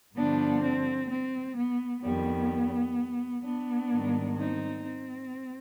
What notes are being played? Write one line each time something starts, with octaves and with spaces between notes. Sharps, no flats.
G2 D3 F3 B3 D4
C4
C4
B3
F2 D#3 G3 B3
B3 D4
G#2 D#3 G3
C4 D#4
C4